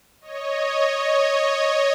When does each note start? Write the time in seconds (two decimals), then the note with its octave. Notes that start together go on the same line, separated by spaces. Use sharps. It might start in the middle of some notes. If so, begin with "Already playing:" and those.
0.21 C#5 D#5
1.06 C#5 D#5